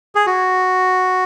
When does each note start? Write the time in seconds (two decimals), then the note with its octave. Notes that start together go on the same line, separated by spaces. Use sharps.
0.15 G#4
0.27 F#4